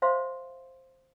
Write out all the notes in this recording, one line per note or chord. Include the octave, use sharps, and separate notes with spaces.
C5 E5 F5 C6